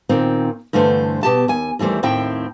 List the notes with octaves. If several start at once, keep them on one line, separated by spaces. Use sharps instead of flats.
A#2 D#3 C4
G2 D3 E3 A3 C5
B2 G4 A5
D#2 G#5
D#2 E3 G3 A3 C5
D#2 A2 C4 E4 G5